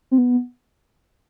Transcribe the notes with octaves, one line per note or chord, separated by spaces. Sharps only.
C4
B3